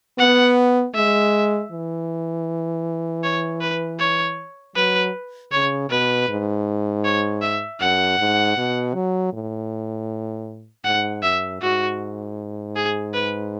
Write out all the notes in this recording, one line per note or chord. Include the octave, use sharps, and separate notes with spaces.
B3 F#5
G#3 E5
E3
C#5
B4
C#5
F#3 B4
C#3 C#5
B2 B4
G#2
C#5
E5
F#2 F#5
G#2
B2
F#3
A2
G#2 F#5
F#2 E5
G#2 F#4
G#4
B4